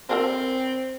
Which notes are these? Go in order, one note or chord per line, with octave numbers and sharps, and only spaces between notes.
C4 A4 A#4 C5